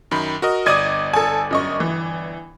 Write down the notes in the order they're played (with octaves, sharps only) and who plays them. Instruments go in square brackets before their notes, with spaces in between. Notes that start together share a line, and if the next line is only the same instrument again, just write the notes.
[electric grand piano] F#2 D#3 B5
F#4 A#4 D#5
[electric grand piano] G1 D5 D#6 [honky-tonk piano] D#5 G#6 D#7
[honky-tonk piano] A4 G#5
F#2 D#5 C#6
E3